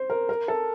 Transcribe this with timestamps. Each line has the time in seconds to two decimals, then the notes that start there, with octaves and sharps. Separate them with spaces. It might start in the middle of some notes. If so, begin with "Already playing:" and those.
Already playing: C5
0.10 A#4
0.29 A#4
0.48 A4